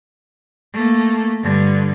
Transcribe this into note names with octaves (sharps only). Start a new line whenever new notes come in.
A3 A#3
G2 D3